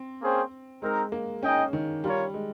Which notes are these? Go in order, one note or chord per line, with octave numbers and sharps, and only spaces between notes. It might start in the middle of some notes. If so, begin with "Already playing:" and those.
Already playing: C4
A#3 C#4 G#4 C5 G5
G#3 C4 D#4 A#4
A#3
C#4 D#4 G#4 D#5 G5
D#3
G3 F4 A#4 C#5
G#3